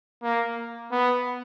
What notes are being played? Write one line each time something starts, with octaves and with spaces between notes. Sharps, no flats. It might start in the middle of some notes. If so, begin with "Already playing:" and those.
A#3
B3